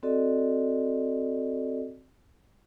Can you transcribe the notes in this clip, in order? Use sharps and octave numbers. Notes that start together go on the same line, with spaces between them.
C4 F#4 A4 D5 D#5